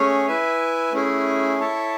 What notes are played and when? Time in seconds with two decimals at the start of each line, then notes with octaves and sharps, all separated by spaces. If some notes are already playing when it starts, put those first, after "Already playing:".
Already playing: A3 C#4 G#4 C#5
0.27 E4 B4 E5 G#5
0.92 A3 C#4 E4 G#4
1.59 E4 A4 C#5 E5 A5